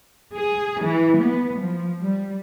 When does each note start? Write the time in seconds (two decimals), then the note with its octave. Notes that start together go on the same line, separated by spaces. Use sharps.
0.37 G#4
0.83 E3
1.20 B3
1.61 F3
2.02 G3